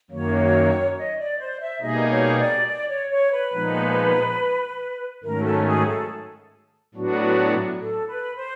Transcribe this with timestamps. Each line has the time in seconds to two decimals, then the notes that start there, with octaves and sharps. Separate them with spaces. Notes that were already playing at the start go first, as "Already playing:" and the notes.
0.10 F#2 D#3 F#3 A#3 C#5
0.96 D#5
1.18 D5
1.39 C5
1.60 E5
1.81 B2 G3 A#3 D#4 G#4 D#5
2.10 C#5
2.39 D5
2.67 D5
2.88 C#5
3.10 C#5
3.32 B4
3.53 A#2 F3 G#3 B3 D#4
5.23 G#2 D#3 F#3 A3 C#4 A#4
5.45 A4
5.66 G#4
5.87 A4
6.94 A2 F#3 B3 D4 F#4
7.80 A4
8.08 B4
8.36 C5